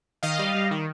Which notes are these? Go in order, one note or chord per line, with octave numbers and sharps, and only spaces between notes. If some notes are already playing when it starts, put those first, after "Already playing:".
D#3 D#5 F5
G3
G3
D#3